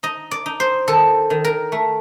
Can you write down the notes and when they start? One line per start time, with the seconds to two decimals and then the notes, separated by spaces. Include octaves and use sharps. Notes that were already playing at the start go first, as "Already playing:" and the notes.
0.03 D#4 D#5
0.31 D5
0.46 D#4
0.60 C5
0.88 D#3 A4
1.30 D#3
1.44 A#4
1.72 A3